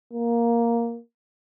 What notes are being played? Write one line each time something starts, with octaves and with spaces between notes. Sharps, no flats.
A#3